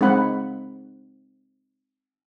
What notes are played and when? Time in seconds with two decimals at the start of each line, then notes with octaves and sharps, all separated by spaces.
0.01 G#3 C4 D#4 F5 F#5 B5